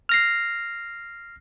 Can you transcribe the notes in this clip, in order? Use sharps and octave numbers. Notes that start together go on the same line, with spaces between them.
F6 A#6 C7